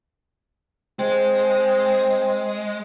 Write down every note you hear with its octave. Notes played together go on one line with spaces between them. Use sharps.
G#3 C4